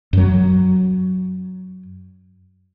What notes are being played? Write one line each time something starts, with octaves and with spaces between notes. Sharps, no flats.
F#2 F#3